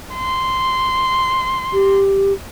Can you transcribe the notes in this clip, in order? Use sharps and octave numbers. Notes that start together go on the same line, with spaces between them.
C6
G4